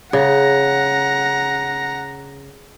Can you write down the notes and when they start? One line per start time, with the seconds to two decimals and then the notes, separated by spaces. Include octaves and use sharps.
0.13 C#3 F#5 A#5